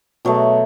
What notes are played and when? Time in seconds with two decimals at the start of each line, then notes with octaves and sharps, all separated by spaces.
0.25 B2 F#3 A3